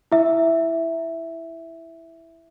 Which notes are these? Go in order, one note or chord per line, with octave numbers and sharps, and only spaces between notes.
E4 E5